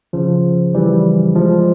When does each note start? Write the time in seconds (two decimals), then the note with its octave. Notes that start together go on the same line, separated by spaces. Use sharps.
0.13 C#3 F3
0.74 E3 G3
1.35 F3 G#3